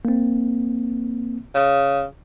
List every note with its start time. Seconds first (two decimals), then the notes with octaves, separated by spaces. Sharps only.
0.05 A#3 C4
1.54 C#3